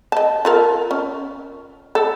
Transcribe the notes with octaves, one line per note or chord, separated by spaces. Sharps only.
D#5 A5
F4 A4 A#4
C#4
A4